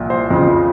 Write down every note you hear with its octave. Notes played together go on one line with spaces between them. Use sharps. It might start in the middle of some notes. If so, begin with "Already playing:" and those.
Already playing: C2 A#2 F3
C5
F2 C#3 F3